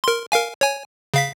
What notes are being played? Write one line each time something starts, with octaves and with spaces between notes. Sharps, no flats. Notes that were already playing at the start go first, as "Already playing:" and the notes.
A#4 C6
A#4 F5 G#5
C#5 G#5
C#3 F5 B6